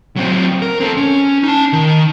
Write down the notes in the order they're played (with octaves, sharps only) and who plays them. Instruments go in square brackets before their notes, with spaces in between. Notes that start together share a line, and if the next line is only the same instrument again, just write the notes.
[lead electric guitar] F#3 C4
A#4
C4 A4
C#4
D#4 A5
D#3